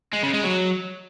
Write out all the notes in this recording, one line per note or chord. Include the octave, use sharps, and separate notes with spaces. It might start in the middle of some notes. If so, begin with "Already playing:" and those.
G#3
C#3
G#3
F#3